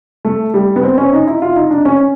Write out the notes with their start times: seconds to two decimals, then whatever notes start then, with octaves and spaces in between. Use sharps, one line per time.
0.25 A3
0.54 G3
0.76 B3
0.83 C4
0.98 C#4
1.13 D#4
1.27 E4
1.42 F4
1.56 D#4
1.70 D4
1.85 C#4